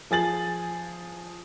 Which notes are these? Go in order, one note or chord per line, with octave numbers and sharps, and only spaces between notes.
F3 G#4 A6 F#7